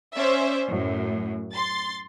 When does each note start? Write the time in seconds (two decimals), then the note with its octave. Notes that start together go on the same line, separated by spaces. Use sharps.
0.16 C#4 C5 D5 E5
0.69 F#2 A2
1.54 C6 A6